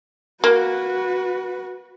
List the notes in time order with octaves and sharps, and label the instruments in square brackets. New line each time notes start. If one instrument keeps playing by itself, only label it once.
[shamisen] A#3 [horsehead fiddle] F#4 B4